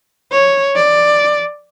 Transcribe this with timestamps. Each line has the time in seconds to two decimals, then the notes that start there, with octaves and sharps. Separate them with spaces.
0.32 C#5
0.76 D5